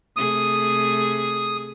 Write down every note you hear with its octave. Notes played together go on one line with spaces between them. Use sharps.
C3 A3 G#4 D#6